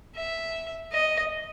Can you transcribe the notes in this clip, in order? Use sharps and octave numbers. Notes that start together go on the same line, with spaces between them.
E5
D#5